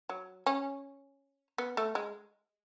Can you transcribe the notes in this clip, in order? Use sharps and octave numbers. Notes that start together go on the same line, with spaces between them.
F#3
C#4
B3
A3
G#3